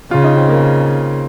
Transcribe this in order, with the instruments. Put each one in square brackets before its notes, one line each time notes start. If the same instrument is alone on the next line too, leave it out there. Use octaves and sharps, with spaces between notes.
[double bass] C#3 [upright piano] F4
[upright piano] D#4
C4
A#3